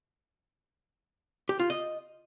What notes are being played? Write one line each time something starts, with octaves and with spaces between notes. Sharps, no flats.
G4
F4
D#5